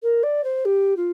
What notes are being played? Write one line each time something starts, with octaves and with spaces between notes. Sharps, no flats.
A#4
D5
C5
G4
F4